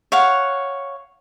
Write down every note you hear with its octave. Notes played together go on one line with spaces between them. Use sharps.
C#5 F5 F#5